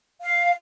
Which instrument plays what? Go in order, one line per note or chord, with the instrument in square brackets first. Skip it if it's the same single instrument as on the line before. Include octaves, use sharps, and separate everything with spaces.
[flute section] F5